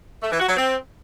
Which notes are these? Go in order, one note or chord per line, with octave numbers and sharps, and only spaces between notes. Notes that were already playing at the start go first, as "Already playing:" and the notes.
A3
E3
F#4
F#3
C4